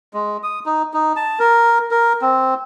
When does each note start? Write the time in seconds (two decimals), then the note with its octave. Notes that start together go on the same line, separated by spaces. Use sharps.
0.14 G#3
0.43 D#6
0.66 D#4
0.94 D#4
1.16 A5
1.39 A#4
1.91 A#4
2.21 C4